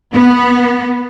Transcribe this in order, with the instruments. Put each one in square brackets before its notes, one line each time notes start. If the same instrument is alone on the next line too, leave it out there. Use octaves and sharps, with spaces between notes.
[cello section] B3